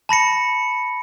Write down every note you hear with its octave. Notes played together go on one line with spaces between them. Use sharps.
A5 B5 A#6 C#7